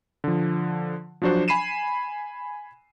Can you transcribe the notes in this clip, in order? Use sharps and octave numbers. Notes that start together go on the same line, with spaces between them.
D3 F3
F3 F#3 D4 F#4 C5
G#5 B5 C7 D#7 E7